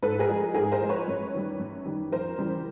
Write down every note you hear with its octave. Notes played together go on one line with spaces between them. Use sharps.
G#2 A4 B4
G#4 A#4
F3 G#3
G#2 G#4 A#4
A#4 C5
F3 G#3
B4 C#5
F#2
D#3 G3
F#2
D#3 G3
F2 A#4 C5
C#3 E3 G3